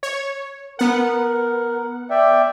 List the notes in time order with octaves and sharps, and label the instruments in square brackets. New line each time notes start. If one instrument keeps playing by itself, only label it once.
[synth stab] C#5
[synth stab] B3 F#5 [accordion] A#4
[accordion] D5 E5 G5